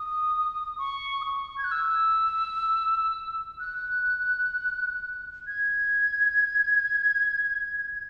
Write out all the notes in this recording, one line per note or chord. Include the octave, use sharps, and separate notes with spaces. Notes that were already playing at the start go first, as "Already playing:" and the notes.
Already playing: D#6
C#6
D#6
C#6
G#6
F#6
E6
F#6
G#6